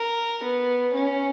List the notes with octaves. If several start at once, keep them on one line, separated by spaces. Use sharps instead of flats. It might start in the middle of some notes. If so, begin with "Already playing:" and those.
Already playing: A#4
B3
C#4